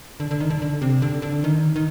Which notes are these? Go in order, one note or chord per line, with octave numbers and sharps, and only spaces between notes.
D3
D3
D#3
D3
D3
C3
D3
D3
D#3
D#3